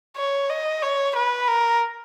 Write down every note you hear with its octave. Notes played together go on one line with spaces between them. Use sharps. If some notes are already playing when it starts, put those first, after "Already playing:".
C#5
D#5
C#5
B4
A#4